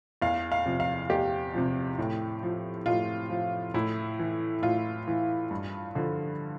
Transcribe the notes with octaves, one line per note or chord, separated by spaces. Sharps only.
E2 F5
F5
C3 F3
F5
E2 G4
C3 F3
A2
F3
A2 F4
F3
A2 E4
E3
A2 F4
E3
G2
D3 F3